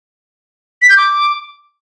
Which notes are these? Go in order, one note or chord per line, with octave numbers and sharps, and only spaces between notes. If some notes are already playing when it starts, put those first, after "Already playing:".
B6
G6
D6